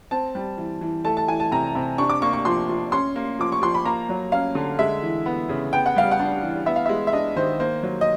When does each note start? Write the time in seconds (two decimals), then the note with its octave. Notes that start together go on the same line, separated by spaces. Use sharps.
0.11 C4 A5
0.35 G3
0.58 E3
0.81 E3
1.05 A3 A5
1.17 A5
1.28 E3 G#5
1.40 A5
1.52 C3 A#5
1.75 C3
1.98 D4 C#6
2.09 D6
2.22 A#3 C#6
2.33 C#6
2.45 F3 C6
2.69 F3
2.92 C#4 C6
3.16 A#3
3.39 F3 D6
3.52 C#6
3.62 F3 C6
3.74 B5
3.85 A#3 A#5
4.09 F#3
4.32 C#4 F5
4.55 D3
4.79 G#3 E5
5.03 E3
5.26 B3
5.49 C#3
5.73 B3 G5
5.86 F#5
5.96 G3 F5
6.11 F#5
6.19 D4
6.42 E3
6.66 B3 E5
6.76 F5
6.86 G#3 E5
7.07 E5
7.13 D4 D#5
7.36 D#3 C5
7.60 A#3 C5
7.83 F#3
8.01 D#5